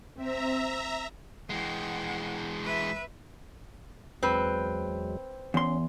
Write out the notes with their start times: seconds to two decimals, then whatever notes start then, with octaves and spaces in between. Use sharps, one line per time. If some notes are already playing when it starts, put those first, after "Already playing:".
0.17 C4 E5 A#5
1.50 E3 G#3 F#5 G5
2.64 B4 E5
4.23 E2 F#3 G#3 C4 B4
5.54 E2 C#4 C6